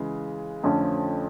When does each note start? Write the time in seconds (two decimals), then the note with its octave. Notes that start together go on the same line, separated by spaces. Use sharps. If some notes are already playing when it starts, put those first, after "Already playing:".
Already playing: C#3 E3 G#3
0.63 F2 D3 F3 A3 C#4